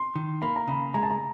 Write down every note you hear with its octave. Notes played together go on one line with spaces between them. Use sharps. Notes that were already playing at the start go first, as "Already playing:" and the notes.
Already playing: C6
D#3
A#3 B5
A#5
C#3 B5
G#3 A#5
A5
A#5